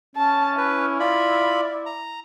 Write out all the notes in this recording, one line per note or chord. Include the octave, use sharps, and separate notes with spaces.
C#4 A5
E4 B4
F4 D5 B5
A#5